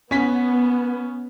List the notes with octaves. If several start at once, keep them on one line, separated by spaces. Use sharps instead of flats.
B3 C#4 B6